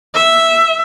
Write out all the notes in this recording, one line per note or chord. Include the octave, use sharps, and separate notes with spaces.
E5